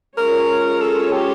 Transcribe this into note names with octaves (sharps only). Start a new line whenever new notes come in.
G#3 C#4 F4 G#4 A#4 C#5
A4
G4